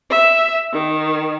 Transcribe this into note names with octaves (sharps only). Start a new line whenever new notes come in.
E5
D#3